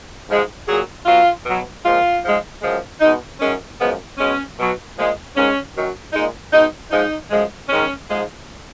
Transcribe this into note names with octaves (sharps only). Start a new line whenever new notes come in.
G#2 F3 G#3
A#2 F#3 G#4
B2 F#3 F4
B2 F#3
A#2 F3 G#3 F4
G#2 F3 G#3
F#2 F3 G#3
B2 G#3 D#4
F#2 D#3 G#3 C#4
F#2 F3 G#3 B3
B2 G#3 C#4
B2 F#3
A#2 F3 G#3
G#2 D#3 G#3 C#4
F#2 D#3 F#3
A#2 G#3 D#4
B2 G#3 D#4
G#2 F3 G#3 D#4
F#2 F3 G#3
G#2 D#3 G#3 C#4
G#2 F3 G#3